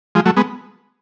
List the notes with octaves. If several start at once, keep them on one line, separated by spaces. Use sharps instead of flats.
F3 G#3
F#3 A3
G#3 B3